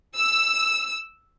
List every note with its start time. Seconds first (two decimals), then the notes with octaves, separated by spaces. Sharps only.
0.15 E6